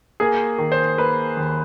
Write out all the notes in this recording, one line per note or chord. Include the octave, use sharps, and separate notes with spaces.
A#3 G#4
D#3
C5
A#3 B4
D#2